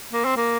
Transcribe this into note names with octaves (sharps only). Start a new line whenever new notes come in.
A#3
C4
A#3